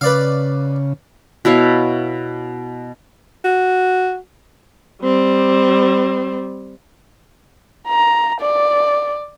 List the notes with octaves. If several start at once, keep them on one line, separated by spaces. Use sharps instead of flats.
C#3 B4 D5 F5
B2 E4 C#5 F5
F#4
G3 C4
A#5
D5